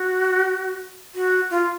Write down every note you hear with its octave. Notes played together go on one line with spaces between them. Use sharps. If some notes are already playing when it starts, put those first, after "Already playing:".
Already playing: F#4
F#4
F4